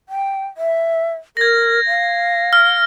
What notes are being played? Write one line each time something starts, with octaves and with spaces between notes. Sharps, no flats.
G5
E5
A#4 G#6 A#6
F5
F6